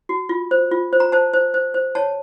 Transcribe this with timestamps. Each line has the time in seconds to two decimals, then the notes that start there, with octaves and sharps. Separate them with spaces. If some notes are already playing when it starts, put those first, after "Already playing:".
0.09 F#4
0.29 F4
0.51 C5
0.71 F4
0.93 C5
1.00 A#5
1.12 C5 A5
1.33 C5
1.54 C5
1.74 C5
1.95 C#5 A5